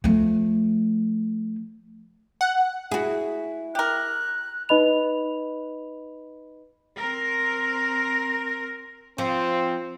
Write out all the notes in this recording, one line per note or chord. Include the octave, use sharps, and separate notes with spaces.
F3 A3
F#5
E4 F#4 G#4
G4 A#4 F#6
D#4 B4 D#5 B5 F7
C4 A#4
F3 C4